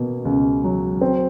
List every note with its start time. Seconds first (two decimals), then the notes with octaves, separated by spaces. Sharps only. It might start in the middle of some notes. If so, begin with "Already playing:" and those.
Already playing: B2 A#3
0.25 C#2
0.64 F#3
1.01 C4